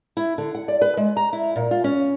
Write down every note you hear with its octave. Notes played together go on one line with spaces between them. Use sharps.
E4
D3
F#5
D5
B4
G#3
A#5
E4
A#2
F4
C#4